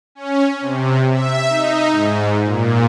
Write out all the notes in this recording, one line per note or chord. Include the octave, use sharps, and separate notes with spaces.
C#4
C3
E5
D#4
G#2
A#2